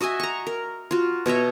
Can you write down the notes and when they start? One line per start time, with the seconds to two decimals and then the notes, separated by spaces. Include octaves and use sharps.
0.01 F#4 D#5 E5 G#5
0.20 A#5 C#6
0.47 A#4
0.91 F4 F#4
1.26 B2 C#5 D#5 E5